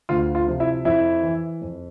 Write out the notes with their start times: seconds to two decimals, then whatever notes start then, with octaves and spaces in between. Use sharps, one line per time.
0.09 D2 F4
0.35 F4
0.47 C3 F3
0.60 E4 E5
0.85 F2 E4 E5
1.23 E3
1.61 F2